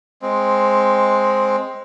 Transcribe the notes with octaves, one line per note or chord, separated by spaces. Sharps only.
G#3 C4